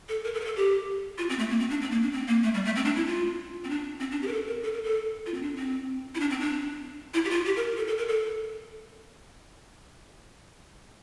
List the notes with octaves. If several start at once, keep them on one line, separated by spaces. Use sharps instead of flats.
A4
A#4
A4
A#4
A4
G4
F4
C4
A3
A#3
C4
D4
C4
A#3
D4
C4
A#3
A3
G3
A3
C4
D4
E4
F4
C4
D4
C4
D4
G4
A#4
A4
A#4
A4
A#4
A4
F4
C4
D4
C4
E4
D4
C4
D4
E4
G4
F4
G4
A#4
A4
A4
A#4
A4